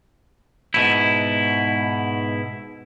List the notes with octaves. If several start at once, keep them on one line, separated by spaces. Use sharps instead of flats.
G#2 B2 E4